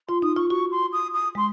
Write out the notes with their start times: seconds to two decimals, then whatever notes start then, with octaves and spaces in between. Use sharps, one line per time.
0.08 F4 C6
0.22 D#4 D#6
0.36 F4 C#6
0.50 F#4 C#6
0.72 C6
0.93 D#6
1.14 D#6
1.35 G#3 C6